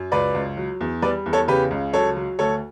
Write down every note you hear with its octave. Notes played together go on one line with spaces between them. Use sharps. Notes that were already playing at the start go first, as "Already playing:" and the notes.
Already playing: F#2
C#2 B4 D5
C#2
F#3
E2
G3 B4 D5
E2
A4 C#5
C#3 G4 B4
C#2
F#3 A4 C#5
F#3
D2 A4 C#5